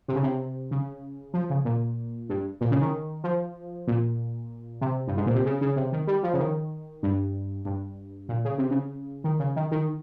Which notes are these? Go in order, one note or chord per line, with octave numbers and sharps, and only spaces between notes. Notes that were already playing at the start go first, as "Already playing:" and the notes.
C3
C#3
C3
C#3
F3
C#3
A#2
G2
A#2
C#3
D#3
F3
A#2
C3
G2
G#2
A#2
C3
C#3
C#3
C3
D#3
G3
F3
C#3
D#3
G2
G2
A#2
C#3
C3
C#3
D#3
C#3
D#3
D#3